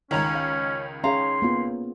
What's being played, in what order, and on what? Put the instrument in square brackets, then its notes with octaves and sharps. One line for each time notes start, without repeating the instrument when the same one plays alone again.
[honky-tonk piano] C#2 D#3 [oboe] C#4 [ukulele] C#5 A#5
[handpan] F5
[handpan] C#4 G#4 C#5 [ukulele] F5 A#5 [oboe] C6
[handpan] A#3 B3 F4